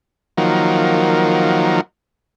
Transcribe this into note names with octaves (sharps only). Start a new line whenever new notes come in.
D#3 F3 F#3 A#3